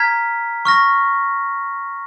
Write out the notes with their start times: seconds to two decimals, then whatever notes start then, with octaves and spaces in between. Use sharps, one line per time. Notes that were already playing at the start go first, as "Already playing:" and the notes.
Already playing: A#5 F6 G#6 B6
0.65 C#6 F6 A#6